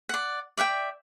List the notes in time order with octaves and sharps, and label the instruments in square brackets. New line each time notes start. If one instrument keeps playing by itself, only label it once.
[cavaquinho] D5 F#5
D5 E5 F#5 G5